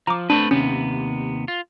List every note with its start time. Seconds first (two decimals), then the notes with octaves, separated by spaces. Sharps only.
0.07 F3 A#5 D6
0.30 A3 C4 D4 B4
0.51 D#2 C3 B3 C#4
1.48 F4